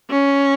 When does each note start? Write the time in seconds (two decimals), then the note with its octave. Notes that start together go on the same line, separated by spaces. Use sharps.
0.10 C#4